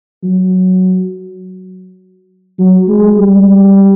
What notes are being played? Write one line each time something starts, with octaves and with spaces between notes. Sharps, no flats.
F#3
F#3
G#3
G3